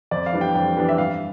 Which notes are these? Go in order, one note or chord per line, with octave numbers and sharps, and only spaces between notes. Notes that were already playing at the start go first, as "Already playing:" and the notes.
F2 D5
F5
E3 G3 B3 D4
G5
F2 G5
E3 G3 B3 D4
E5
G2 F5